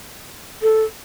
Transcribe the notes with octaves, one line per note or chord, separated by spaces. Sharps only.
A4